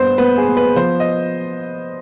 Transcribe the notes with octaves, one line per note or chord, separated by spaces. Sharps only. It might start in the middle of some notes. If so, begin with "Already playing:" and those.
Already playing: G2 B3 C5
B3 B4
G#4
B3
B4
F3 C5
D#5